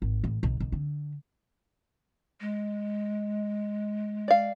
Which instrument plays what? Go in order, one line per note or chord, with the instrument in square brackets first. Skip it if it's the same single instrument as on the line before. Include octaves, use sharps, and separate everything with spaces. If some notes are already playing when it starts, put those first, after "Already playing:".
[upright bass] G#1
A1
B1
B1
D3
[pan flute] G#3
[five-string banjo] D5 F5